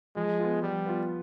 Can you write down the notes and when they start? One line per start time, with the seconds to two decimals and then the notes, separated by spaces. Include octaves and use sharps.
0.16 F3 G#3
0.39 B3 F4
0.62 F3 G3
0.86 B3 F4